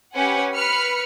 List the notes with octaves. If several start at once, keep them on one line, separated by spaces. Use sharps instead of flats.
C#4 G4 B4 F#5 G#5
B4 B5 F6 C#7